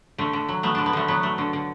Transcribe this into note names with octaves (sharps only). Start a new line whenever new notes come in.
D3 A3
D3
F#3
A3 B3
D3 D4
B3
D3 A3
F#3 B3
A3
D3
D3